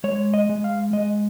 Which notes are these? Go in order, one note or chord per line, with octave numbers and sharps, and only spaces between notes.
G#3 C#5
D#5
G#3
F5
G#3 D#5